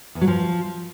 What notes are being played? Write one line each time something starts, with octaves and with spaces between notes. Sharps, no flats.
E2
F#3
F3